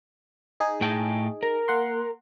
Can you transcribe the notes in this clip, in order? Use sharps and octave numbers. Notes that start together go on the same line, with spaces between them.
D#4 G#4
A2 G5 A5
A#4
A#3 F#5 C6